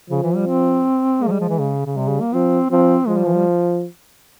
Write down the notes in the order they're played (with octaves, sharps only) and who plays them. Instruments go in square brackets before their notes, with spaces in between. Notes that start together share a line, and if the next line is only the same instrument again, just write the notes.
[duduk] C#3 [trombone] F3
[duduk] E3
G3
C4
[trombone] G#3 [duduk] A#3
[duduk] F3
G3
F3
E3
C#3
C#3
[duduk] C3 [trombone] G3
[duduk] C#3
A#3
[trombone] F3 [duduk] C4
[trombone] F3 [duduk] C4
[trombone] F3 [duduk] G#3
[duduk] G3
E3
G3